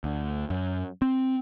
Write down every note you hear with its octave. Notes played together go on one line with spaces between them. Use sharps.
D2
F#2
C4